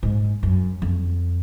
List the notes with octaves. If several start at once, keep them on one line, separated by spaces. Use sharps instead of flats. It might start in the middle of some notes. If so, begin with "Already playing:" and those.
G#2
F#2
F2